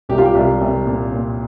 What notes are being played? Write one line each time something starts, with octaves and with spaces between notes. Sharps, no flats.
C2 G4
F4
G4
C2
C2
A#2
A#2